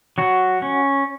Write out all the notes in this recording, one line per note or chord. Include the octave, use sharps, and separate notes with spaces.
F#3 F#4
C#4